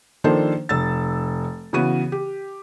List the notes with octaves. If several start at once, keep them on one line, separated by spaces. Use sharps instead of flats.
D#3 F3 A#3 D4 A4 C5
F1 E6 A6
C#3 E3 B3 F#4 D#7
G4